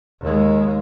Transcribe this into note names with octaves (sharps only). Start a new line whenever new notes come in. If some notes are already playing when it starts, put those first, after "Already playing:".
D#2 G#3